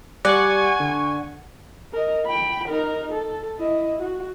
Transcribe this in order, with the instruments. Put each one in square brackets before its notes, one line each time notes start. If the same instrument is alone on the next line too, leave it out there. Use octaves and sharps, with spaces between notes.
[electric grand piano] G3 [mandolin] D5 [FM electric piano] F#5 C#6 [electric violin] G#5
[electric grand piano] D3
[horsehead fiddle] A#4 D#5
G5 B5
D#4 A#4
A4
E4 D#5
F#4